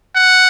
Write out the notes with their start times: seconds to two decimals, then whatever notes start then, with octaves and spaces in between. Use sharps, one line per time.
0.16 F#5